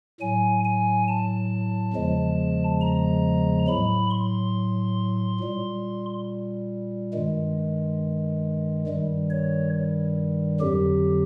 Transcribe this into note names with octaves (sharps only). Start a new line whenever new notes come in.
A2 F#3 G#5
G#5
A5
E2 C#3 F3 G#3
A#5
A2 F#3 B5
C6
A#2 G3
G2 D#3 G#3
G2 D#3 G3
C#5
F2 D3 F#3 G4